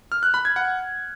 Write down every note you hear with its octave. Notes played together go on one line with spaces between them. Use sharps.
F6
F#6
B5
G#6
F#5